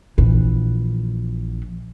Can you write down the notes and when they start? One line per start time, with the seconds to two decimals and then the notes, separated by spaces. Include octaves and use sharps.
0.18 A#1 E3